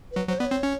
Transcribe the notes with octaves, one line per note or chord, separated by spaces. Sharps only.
F#3 B4
F#3 C5
B3 D5
C#5
C4
C#4